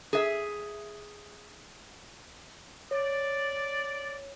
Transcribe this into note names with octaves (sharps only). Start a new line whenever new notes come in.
G#4 E5
C#5 D5